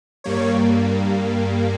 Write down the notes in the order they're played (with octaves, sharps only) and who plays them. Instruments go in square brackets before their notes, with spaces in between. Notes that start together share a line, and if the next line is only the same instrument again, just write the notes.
[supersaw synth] G2 G3 A#3 C#5